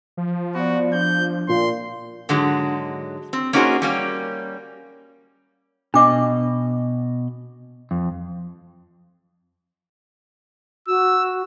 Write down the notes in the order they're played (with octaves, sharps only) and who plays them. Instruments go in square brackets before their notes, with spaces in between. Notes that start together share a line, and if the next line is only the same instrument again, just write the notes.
[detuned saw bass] F3
[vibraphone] B3 D5 [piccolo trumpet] F#4
[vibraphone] D4 [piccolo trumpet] G6
[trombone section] A#2 [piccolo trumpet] C6
[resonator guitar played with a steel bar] G#2 D3 F#3 G#3
C4
A#3 C#4 D#4 F#4 G#4 C5
G3 A#3 C#4
[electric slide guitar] B2 D#5 [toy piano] D4 D6
[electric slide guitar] F2
[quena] F#4 [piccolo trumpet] E6